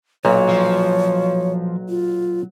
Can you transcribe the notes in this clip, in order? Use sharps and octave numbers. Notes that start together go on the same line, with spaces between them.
B1 A#2 F#3 C#5
F3
F4